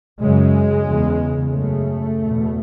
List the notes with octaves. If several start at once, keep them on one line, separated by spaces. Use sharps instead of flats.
F#2 C#3 G#3
E2 C#3
F#2 C#3 A3
E2 B2